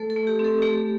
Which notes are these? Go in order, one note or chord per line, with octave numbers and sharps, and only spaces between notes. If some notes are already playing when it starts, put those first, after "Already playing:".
Already playing: A3 A4
A4
A3
G4
C4
A4
A3 G4